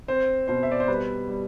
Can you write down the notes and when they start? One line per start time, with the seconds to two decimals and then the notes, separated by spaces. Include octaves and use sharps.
0.08 C4 C5
0.48 B2 C5
0.63 E5
0.72 D5
0.80 C5
0.88 G3 B4
1.28 G3